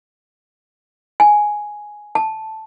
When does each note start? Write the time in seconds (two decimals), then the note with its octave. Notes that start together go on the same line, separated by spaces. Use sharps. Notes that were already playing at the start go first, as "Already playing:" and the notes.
1.20 G#5
2.15 A5